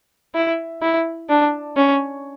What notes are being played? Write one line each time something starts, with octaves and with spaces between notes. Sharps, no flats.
E4
E4
D4
C#4